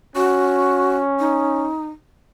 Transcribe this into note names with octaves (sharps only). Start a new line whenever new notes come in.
C#4 F#4
D#4